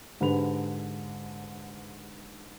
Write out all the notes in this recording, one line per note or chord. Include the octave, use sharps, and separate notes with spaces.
G#2 D3 G4 B4 B5 F7